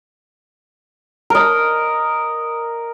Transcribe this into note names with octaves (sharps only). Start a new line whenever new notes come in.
A#4 D#5